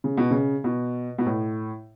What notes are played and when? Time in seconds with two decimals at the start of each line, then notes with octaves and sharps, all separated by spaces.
0.04 C#3
0.17 B2
0.31 C#3
0.64 B2
1.18 B2
1.26 A2